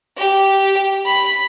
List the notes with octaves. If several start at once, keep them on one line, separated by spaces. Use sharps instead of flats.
G4
B5